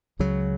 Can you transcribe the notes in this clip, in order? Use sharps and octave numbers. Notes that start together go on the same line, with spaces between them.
C#2 C#3 F#3